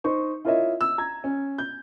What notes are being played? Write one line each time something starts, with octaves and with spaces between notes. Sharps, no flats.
D#4 C5 C#6
E4 F4 A#4 C#5 D#5 E5
E6
A#5 G#6
C#4
G6